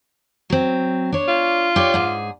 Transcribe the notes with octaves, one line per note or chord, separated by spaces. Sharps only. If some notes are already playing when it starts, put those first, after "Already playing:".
F#3 C4
D4 C#5
F4
G4 C#5 D5
G#2 G#4